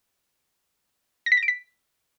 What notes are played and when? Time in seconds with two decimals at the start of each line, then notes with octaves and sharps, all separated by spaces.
1.26 A#6
1.32 B6
1.37 A#6
1.43 D7
1.48 B6